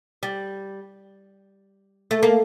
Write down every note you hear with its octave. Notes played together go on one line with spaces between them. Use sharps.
G3
A3
A#3